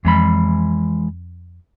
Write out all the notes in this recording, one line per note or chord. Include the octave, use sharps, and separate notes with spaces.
F2 E3 G#3 B5